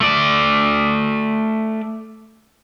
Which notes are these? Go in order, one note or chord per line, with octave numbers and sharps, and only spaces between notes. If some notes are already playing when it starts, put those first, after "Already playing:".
A3 D5